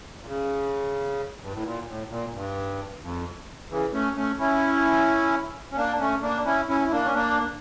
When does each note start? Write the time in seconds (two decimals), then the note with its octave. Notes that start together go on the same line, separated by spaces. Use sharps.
0.22 A#2
0.26 C#3
1.42 G2
1.53 A2
1.63 A#2
1.87 A2
2.10 A#2
2.33 G2
3.01 F2
3.70 C#3 E3
3.93 A3 C#4
4.16 A3 C#4
4.39 C#4 E4
5.72 C#4
5.77 A#3 D4
5.99 A3 C#4
6.22 A#3 D4
6.45 C#4 E4
6.69 C#4 E4
6.81 E4
6.91 A#3 D4
7.03 C#4
7.14 A#3 D4